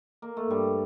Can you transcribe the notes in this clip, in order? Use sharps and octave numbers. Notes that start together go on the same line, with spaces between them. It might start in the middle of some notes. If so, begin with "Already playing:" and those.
A#3
A3
G2 G3